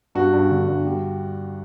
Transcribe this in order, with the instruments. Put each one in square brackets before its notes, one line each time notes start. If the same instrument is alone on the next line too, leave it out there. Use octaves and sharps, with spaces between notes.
[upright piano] G2 F#4
G2
D3
G2
G3